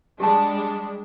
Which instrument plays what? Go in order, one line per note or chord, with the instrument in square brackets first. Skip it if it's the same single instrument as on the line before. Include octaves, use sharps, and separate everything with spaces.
[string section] G3 G#3 D4 [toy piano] G4 A5